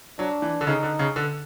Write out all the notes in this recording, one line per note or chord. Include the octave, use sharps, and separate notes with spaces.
F#3 D4
E3
D3
C#3 D#4
D3
C#3
D3